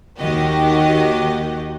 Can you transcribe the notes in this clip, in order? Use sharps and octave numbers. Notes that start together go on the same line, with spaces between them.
D#2 D#3 F#4 G4 D#5